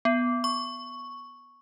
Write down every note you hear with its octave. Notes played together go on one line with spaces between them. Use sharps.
B3
C#6